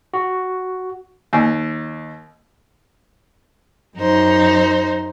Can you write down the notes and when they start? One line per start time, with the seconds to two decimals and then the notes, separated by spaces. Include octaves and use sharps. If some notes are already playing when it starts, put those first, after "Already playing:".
0.14 F#4
1.33 D#2
3.96 F#2 D#4 C5